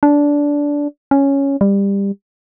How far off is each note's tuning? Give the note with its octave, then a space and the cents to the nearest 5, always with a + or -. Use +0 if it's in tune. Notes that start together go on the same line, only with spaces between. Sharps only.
D4 -15
C#4 +0
G3 +20